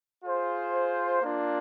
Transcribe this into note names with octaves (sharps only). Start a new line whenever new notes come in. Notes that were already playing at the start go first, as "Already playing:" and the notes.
F4 G#4 C5
A#3 D4 F4